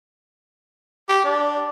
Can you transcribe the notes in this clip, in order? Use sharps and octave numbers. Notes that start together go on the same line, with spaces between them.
G4
D4